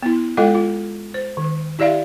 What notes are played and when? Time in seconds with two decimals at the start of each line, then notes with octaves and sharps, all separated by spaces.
0.02 B3 E4
0.37 G#3 F4 A4 D#5 G5
0.55 F4
1.14 C5
1.37 D#3
1.79 E4 G4 D5 E5 F5